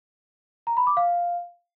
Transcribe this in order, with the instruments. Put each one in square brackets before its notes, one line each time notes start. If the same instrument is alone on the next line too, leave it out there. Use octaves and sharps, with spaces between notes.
[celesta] A#5
B5
D6
F5